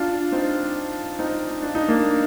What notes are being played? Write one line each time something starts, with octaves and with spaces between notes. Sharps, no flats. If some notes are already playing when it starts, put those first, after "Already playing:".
Already playing: D4 F4
C4 D#4
C4 D#4
D4
D#4
A#3 D4